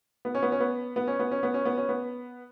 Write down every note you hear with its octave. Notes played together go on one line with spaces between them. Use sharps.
B3
C#4
B3
C#4
B3
B3
C#4
B3
C#4
B3
C#4
B3
C#4
B3